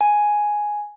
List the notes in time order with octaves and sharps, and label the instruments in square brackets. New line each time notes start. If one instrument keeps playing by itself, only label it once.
[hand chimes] G#5